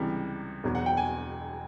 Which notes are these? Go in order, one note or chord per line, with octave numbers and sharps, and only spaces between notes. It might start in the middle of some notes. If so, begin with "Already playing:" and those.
Already playing: C#2 C3 E3 G3
E1 E2 B2 F#3
F#5
G5
G#5